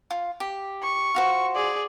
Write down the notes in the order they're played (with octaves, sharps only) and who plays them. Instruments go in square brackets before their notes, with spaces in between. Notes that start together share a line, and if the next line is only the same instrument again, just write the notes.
[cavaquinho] F4
G4
[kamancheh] C#6
[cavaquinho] F4 F#4 C5
[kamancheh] G#4 D5